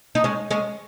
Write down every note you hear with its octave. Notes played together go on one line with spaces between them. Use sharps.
D#4
G#3 C#4
G#3 C#4